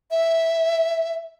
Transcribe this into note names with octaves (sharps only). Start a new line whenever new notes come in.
E5